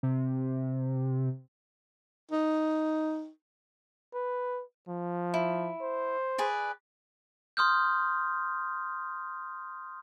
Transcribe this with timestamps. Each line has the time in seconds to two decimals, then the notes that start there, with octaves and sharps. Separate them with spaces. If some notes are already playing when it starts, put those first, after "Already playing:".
0.03 C3
2.31 D#4
4.14 B4
4.88 F3
5.34 E4
5.81 C5
6.38 G#4 B4 D5
7.57 C6 D#6 F6 G6